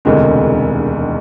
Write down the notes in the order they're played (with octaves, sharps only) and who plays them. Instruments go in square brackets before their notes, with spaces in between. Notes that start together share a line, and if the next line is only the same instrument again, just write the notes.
[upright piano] E1 D2 C3 D#3 G#3